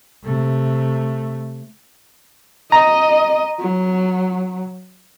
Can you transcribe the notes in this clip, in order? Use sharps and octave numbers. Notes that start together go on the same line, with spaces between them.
C3 A3
D#5 A#5
F#3